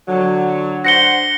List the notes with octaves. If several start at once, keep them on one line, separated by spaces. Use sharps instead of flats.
D3 F#3
D4 C5 F#5 A#6 C#7 G7